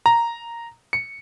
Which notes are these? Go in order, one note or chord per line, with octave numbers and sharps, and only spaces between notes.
A#5
C#7